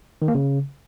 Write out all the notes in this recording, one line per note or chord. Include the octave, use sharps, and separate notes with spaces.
D#3
A#3
C#3